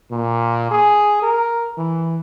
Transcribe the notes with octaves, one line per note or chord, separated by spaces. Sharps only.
A#2
G#4
A#4
E3